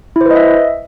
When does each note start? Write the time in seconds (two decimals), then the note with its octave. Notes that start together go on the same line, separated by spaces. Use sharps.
0.16 E4
0.21 C5
0.26 B4
0.31 D#5
0.36 E5